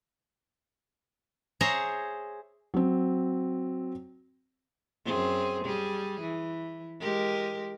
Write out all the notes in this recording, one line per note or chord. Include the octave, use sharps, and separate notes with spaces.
G#4 C5 C#5 E5 A#5
F#3 C4
F#2 C4 G#4
G3 G#4
E3
G#3 G4 A#4